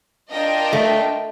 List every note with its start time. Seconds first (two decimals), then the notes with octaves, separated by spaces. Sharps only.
0.31 D4 F4 A#4 D#5 G5
0.73 A3